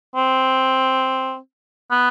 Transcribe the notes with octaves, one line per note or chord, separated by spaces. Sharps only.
C4
B3